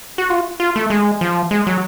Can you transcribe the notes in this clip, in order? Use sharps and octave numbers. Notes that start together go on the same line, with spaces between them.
F#4
F4
F4
A3
G#3
F3
G#3
F#3